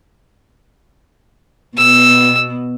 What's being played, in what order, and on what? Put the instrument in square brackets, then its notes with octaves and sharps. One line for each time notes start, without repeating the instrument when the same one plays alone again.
[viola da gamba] B2 B3 [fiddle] E6